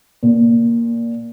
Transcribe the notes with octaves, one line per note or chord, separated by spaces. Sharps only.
A#2